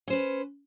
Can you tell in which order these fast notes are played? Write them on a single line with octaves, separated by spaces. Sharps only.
C#4 C5 B4